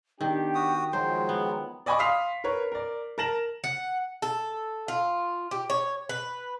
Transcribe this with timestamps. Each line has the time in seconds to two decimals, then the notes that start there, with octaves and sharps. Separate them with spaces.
0.21 D#3 B3 D4 G4 G5
0.55 F#4 D#6
0.93 F3 F#3 G#3 C5
1.29 B3
1.86 D5 D#5 G#5 B5 C#6 D6
1.99 F5 C6 D#6 B6 C7 F7
2.44 A#4 B4 C#5
2.72 A#4 D5
3.18 A#4 A5 A#6 E7 F#7
3.64 F#5
4.22 A4
4.88 F4
5.51 G4
5.70 C#5
6.09 B4